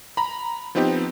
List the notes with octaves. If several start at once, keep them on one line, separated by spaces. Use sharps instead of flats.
A#5 B5
F3 B3 C4 D#4 G4